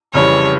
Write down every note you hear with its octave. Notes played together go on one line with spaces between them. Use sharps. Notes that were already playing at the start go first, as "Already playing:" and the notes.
F1 F2 C#3 E3 G3 C#5